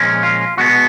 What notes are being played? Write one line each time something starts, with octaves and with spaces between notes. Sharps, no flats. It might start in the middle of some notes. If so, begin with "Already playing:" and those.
Already playing: A#2 F3 G#3 C#4
F4
B2 G#3 B3 F#4